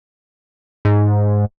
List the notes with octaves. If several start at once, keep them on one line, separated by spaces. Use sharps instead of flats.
G#2